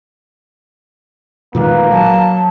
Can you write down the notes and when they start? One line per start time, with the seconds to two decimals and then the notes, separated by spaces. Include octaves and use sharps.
1.55 A#2 D#3 G#3 A#3 B4
1.92 F#3 A5